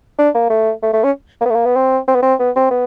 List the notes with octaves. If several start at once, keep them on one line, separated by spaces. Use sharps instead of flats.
D4
A#3
A3
A3
A3
C#4
A#3
B3
A3
A#3
B3
C4
C4
B3
C4
B3
C4
B3